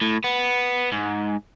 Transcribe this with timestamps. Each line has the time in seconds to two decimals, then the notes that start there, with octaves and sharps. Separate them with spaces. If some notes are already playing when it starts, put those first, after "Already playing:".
0.01 A2
0.24 B3
0.92 G#2